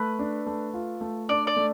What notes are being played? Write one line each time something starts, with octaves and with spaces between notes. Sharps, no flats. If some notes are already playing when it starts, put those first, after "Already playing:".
Already playing: A3 B4
D4
A3
F4
A3
D4 D5
D5
A3